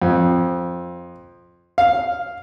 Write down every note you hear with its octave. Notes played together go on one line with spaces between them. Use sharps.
F2
F5